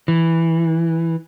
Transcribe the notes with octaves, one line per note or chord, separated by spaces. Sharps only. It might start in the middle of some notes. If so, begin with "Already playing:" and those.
E3